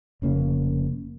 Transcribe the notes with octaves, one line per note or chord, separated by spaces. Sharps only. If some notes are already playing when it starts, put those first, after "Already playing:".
F1 C#3 A#3